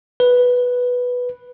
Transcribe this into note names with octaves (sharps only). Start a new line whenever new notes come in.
B4